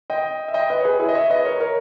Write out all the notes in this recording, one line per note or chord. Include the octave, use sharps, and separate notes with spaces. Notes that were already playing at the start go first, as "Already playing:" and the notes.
D#5 G5
E5
D#5 G5
B4 D#5
C#5
G#4 B4
E4 G#4
D#5
C#5 E5
B4 D#5
A#4 C#5
A#4 C#5